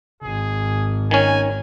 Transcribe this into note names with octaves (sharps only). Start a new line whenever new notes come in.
G#1 G#4
D#3 C#4 G#5